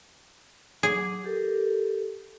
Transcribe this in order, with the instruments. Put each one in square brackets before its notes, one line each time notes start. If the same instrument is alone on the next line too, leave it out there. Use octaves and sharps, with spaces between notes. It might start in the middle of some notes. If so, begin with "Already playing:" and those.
[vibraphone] F#3 D6 [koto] G#4
[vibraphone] G4 A4 A#4